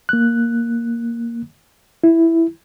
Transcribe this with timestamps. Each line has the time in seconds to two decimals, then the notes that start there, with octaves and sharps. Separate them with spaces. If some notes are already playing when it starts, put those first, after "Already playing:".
0.09 A#3 F#6
2.04 E4